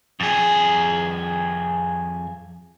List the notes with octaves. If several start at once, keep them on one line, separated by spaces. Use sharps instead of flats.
F2 G#4